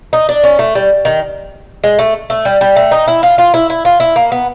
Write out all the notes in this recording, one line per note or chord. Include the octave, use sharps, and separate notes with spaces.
D#4
D4
C#4
A3
G3
D#3
G#3
A3
A3
G3
G3
A3
D#4
E4
F4
F4
E4
E4
F4
E4
A#3
B3